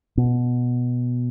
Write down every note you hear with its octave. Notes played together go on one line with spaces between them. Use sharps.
B2